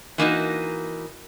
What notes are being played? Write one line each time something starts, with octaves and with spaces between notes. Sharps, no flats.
E3 A#3 D#4 F#4